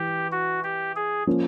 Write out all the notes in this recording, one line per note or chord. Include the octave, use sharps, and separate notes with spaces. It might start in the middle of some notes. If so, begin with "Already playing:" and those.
Already playing: E3 G4
F#4
G4
G#4
F3 A#3 C#4